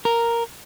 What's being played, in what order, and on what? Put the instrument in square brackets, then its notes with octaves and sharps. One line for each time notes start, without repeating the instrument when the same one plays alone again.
[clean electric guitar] A#4